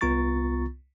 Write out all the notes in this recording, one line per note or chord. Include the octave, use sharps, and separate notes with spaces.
C2 B3 F4 A#5 C#6 A6